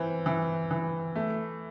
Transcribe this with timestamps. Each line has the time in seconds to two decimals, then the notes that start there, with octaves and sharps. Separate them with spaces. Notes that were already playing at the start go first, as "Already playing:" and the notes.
Already playing: E3 C4
0.26 E3
0.71 E3
1.15 A3